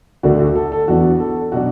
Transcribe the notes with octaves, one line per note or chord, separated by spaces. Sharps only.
D2 D3 A3 D4 F#4
F#4
A4
A4
E2 E3 B3 D4 F#4
A4
B2 F#3 D4 F#4